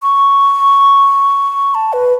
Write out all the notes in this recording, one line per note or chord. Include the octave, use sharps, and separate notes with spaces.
C#6
A5
B4